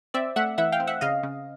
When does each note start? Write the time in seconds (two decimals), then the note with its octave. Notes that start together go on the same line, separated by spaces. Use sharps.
0.14 C4 D5 E5
0.36 A3 E5 F#5
0.58 E3 E5 F#5
0.72 F5 G5
0.80 C4
0.87 E5 F#5
1.01 C#3 D#5 F5
1.23 C#3